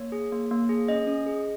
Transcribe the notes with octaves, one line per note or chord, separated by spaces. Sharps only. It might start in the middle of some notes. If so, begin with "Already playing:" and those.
Already playing: A#3 C#5
G#4
A#3
A#3
G#4
C#4 D#5
C#4
G#4